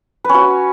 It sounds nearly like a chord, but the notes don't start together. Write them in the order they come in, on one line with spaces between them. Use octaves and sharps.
B4 C#4 F#4